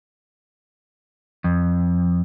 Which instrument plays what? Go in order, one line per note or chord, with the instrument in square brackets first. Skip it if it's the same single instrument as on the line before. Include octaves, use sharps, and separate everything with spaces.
[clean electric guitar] F2